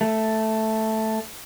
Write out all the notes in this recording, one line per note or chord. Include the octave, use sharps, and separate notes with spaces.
A3